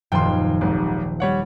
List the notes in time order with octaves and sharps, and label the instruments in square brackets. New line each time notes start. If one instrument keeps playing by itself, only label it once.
[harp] D#1 F#2 F3 [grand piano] G5 C6
[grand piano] G#1 G#2 [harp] G4
[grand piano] G3 C#5 F#5